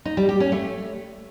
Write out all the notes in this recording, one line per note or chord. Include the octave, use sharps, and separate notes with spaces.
D#4
G3
G4
C#4
A3